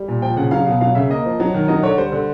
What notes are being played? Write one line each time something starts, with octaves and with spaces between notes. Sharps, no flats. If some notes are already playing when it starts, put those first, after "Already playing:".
Already playing: G3
A#2
F3 G5
C#3 F#5
F#3 F5
B2 F5
F#3 F5
C#3 E5
A#3 D#5
F3
F#3
D#3
F#3 D#5
D3 C#5
G3 C5
D3